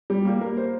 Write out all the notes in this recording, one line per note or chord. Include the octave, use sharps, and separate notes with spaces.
G3
A#3
A#4
C5